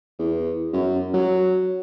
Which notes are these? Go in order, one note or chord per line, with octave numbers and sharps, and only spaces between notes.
E2
F#2
F#3